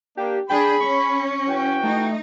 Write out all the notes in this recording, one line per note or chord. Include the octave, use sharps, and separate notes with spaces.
A#3 D4 G4
D4 G#4 G5 B5
C#4 C#6
E3 F#4 G5
A3 D#4